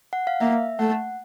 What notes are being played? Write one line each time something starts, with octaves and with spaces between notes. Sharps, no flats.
F#5
F5
A#3 E5
A3 F#5